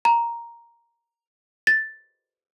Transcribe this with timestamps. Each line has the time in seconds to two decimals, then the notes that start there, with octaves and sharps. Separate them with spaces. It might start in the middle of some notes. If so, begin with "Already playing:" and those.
0.05 A#5
1.67 A6